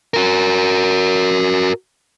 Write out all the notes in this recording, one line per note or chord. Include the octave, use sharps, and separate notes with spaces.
F#4 A#4